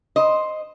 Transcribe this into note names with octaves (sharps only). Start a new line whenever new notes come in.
C5 D#5